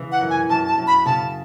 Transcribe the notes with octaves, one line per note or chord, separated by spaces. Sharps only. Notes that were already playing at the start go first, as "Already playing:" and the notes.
Already playing: C#3 E3
F#5
F#2
G#5
F#2 A5
A5
F#2
B5
C#3 A5